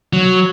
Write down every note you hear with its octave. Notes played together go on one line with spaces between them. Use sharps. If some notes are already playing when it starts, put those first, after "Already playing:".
F#3